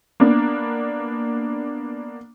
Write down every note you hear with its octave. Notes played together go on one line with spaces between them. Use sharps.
A#3 B3 D4